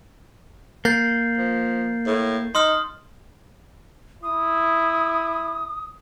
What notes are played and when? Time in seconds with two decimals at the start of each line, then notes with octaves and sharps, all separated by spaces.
0.85 A#3 G6 A6 C7
1.37 F3
2.07 A2
2.55 D#4 C6 D#6 F6
4.23 E4 D#6